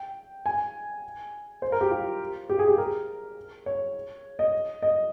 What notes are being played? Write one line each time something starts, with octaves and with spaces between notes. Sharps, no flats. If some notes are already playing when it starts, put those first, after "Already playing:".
Already playing: G5
G#5
C5
A#4
G4
F4
G4
G#4
G4
A#4
C#5
D#5
D#5